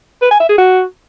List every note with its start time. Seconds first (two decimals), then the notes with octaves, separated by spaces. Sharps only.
0.22 B4
0.31 G#5
0.40 E5
0.49 G#4
0.58 F#4